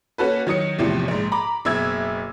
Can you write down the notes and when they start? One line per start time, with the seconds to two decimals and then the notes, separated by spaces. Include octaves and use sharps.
0.18 A#3 C#4 F#4 A4 B4
0.47 D#3 F#3 D#6 C#7
0.78 E2 A2 C3 E3 F3
1.08 A#1 G#2
1.32 A#5 B5 D6
1.65 F#1 B2 E5 E6 G#6